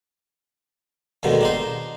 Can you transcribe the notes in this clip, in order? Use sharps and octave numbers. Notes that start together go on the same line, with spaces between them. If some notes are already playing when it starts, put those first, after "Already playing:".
D#2 G#2 B2 D3 D#3
D4 D#4 C5